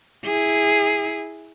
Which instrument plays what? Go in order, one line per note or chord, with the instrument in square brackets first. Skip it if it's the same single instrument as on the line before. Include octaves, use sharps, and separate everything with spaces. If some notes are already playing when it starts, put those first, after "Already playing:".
[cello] E4 G#4